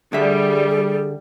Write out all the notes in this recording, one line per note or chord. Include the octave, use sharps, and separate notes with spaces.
D3 G3 G#4 E5